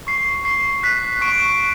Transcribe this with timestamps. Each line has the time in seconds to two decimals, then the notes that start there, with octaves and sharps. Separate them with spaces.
0.07 C#6 C7
0.45 C#6 C7
0.83 F#6 B6
1.21 C#6 D7